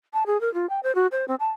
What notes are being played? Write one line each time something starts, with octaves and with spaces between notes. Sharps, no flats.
A5
G#4
A#4
F4
G5
C5
F#4
C5
C4
A5